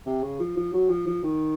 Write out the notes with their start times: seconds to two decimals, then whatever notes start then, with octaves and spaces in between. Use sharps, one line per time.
0.06 C3
0.23 C#3
0.40 F3
0.57 F3
0.74 F#3
0.90 F3
1.07 F3
1.23 D#3